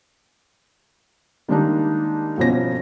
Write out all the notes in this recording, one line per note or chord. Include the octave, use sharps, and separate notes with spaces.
D#3 G3 G#3 A#3 D4 D#4
G1 B2 F3 C4 C#4 A#6